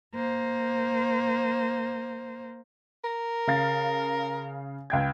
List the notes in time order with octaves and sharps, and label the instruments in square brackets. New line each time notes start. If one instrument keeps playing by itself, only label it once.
[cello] A#3 C5
[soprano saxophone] A#4
[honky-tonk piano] C#3 F5 A6
C#2 G5 G#6